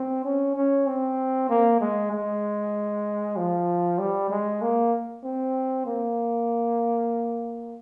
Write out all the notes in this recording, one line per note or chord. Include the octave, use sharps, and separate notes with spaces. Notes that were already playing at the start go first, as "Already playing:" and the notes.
Already playing: C4
C#4
C#4
C4
A#3
G#3
G#3
F3
G3
G#3
A#3
C4
A#3